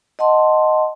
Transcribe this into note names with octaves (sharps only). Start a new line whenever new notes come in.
D#5 F#5 A5 C6